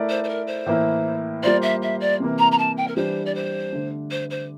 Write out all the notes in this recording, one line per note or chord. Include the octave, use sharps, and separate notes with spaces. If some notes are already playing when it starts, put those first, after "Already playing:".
Already playing: A3 E4 A#4 D5
C5
C5
A#4
C5
A2 E3 A#3 E4
G3 A#3 F4 C5 D5
E5
E5
D5
C3 E3 A#3
A#5
A#5
A5
G5
A#4
E3 G3 D4 G4 C5 D5
D5
C5
D3 A3 D4
C5
C5